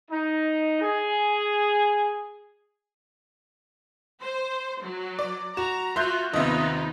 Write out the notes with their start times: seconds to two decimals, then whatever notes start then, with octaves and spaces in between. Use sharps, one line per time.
0.11 D#4
0.81 G#4
4.22 C5
4.83 F#3
5.19 D5
5.57 F#4 A#5 E7
5.96 F4 F#4 E5 C6 F#6 G6
6.34 D#2 C3 B3 D#4 F4 D#5 E5